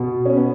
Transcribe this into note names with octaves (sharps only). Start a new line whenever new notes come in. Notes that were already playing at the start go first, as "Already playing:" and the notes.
Already playing: B2 B3
C#4
B3